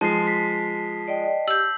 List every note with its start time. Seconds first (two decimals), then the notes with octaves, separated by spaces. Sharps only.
0.01 F3 G#3 A5 C7
0.27 B6
1.08 D5 D#5 G5
1.48 G4 E6 G6 F#7